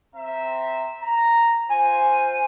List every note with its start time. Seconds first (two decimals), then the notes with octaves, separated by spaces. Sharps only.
0.14 C4 E5 A#5
1.01 A#5
1.69 F4 C5 G#5